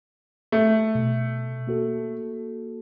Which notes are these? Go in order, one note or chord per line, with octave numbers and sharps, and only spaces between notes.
A3
B2
A#3 F#4 A4